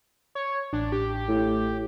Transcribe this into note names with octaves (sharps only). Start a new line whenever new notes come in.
C#5
A1 D4
G4
A2